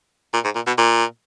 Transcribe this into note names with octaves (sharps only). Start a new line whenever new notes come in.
A#2
G#2
A#2
B2
A#2